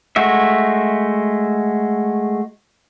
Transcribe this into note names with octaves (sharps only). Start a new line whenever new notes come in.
G#3 A3 F#4 E5